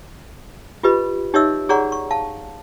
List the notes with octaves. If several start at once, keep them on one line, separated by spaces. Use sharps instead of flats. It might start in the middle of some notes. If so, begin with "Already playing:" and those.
F4 G4 B4 D#5 B5
D#4 G4 C#5 D#5 E5 E6
G#4 C#5 D5 F#5 A#5 C#6
C#6
F5 A5